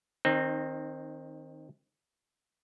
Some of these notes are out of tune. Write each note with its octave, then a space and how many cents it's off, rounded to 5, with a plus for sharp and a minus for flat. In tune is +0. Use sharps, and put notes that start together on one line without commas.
D#3 +0 C4 +15 D#4 -20